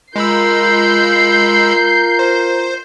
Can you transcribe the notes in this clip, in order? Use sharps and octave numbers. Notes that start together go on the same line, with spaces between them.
G#3 F4 A#4 B5 E6 G6 C7
C5